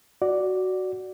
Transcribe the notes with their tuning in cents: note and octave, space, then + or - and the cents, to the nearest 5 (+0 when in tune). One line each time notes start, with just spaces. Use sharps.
F#4 +5 D5 +0